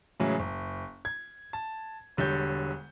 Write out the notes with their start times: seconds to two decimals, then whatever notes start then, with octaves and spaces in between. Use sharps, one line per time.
0.20 A2 C#3 E3 F#3 G#3
0.39 F#1
1.05 G#6
1.53 A5
2.17 E1 D3 G3 C#5 G6